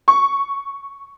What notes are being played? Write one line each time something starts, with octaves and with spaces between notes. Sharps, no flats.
C#6